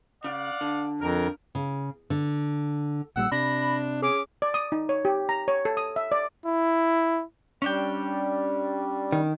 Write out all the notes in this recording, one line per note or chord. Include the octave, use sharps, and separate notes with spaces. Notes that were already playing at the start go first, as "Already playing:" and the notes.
C#3 D5 F5 F#5
D3
F2 A#4
C#3
D3
A#1 A#2 G3 F#5 E6
C3 D4 B5 A#6
C#4 G#4 D6
D5
D#6
D#4
C#5
G4
A#5
C#5
A4
D#6
E5
D5
E4
G3 C#4 D4 G5
D#3